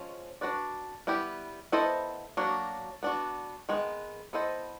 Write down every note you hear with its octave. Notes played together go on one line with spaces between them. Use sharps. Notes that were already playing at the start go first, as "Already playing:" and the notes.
Already playing: F3 G#3 C#4
D4 F#4 B4 D5
G3 B3 E4 G4
B3 E4 A4 C5 D#5
F#3 A#3 D4 F#4
B3 D4 F#4
D#3 G#3 B3
B3 E4 A4 C5 D#5